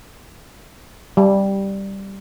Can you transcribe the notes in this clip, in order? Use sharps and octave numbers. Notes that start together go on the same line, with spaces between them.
G3